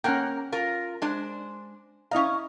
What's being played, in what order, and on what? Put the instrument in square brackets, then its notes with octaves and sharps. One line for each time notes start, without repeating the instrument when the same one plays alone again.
[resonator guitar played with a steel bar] A#3 A#4 [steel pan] C#4 F#5 G5
[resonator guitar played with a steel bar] F4 A#4
G#3 D4 C5
[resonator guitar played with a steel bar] C#4 F5 [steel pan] E4 D#5 A#5